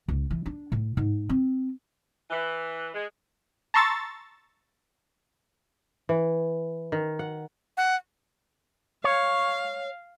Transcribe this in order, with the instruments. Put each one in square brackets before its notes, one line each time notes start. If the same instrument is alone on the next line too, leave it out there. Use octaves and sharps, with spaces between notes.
[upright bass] C#2
E3
D4
A2
G#2
C4
[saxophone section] E3
G#3
[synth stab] A5 A#5 C6 C#6 E6 A6
[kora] E3
D#3
F#5
[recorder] F#5
[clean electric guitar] C#5 [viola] F5